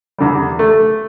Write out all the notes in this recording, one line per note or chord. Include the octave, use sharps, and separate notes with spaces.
E2 D3 G3
A3